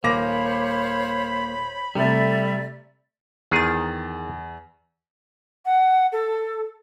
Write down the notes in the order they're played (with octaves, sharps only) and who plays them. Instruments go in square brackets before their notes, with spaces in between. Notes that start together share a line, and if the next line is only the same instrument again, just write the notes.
[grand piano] D#1 D6 A#6 [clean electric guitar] A#3 [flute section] C5 C#5 [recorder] B5
[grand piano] C3 A3 [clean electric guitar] G3 [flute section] A4 D5 E5
[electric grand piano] E2 A6 [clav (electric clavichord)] D#3 G#4
[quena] F#5
A4